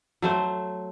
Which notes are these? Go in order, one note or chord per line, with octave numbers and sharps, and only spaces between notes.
F#3 A3 C5